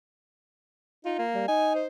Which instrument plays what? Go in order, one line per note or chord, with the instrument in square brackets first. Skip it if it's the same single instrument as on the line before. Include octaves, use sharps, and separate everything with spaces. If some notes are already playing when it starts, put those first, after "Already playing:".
[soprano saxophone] D#4 [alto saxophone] F4
[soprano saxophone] A#3
[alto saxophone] G3
[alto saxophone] D#4 [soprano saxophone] G#5
[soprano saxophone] C5